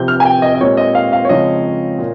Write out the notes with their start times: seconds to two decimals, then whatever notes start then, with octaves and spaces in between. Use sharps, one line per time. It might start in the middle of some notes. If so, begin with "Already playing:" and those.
Already playing: C3 F3 C4 G4 G6
0.08 F6
0.20 G#5
0.25 G5
0.42 D#5
0.55 D#5
0.60 A#2 G#3 C4 D#4 G4 C#5
0.77 D#5
0.95 F5
1.13 F5
1.25 C#5
1.29 C#3 F3 G#3 C4 D#4 D#5
1.99 A#2